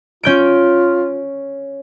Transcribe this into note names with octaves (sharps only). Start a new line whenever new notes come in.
C#4 F4 G6 D7